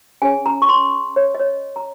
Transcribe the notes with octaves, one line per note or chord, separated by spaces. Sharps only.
C#4 G#4 C#5 G#5
A#5
C#6
C6
C#5
D#5
C#5
A#5